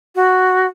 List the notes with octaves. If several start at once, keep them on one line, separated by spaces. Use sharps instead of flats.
F#4